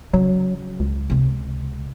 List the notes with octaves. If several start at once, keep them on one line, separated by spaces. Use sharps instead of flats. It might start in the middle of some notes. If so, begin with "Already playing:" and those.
C#3 F#3
C#2
C3 G#3